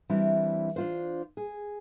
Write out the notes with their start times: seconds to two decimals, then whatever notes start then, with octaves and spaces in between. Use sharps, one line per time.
0.09 E3 G3 C4 D4 E4
0.76 D4 F4 C5
1.37 G#4